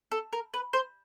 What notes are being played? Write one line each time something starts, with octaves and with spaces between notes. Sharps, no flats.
A4
A#4
B4
C5